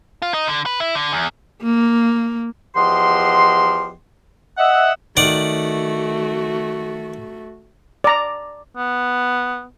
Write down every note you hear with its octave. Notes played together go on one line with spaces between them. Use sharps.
F4
D#4
D3
B4
E4
D3
E2
A#3
E2 F3 G4 D#5 F#5 C6
D#5 E5 F#5
D#3 A3 F#4 D5 F#5
D5 A#5
B3